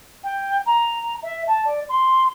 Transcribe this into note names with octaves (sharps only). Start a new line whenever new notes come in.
G5
A#5
E5
A5
D5
C6